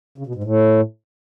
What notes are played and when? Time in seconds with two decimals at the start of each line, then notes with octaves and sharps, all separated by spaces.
0.18 C#3
0.26 B2
0.35 G#2
0.44 A2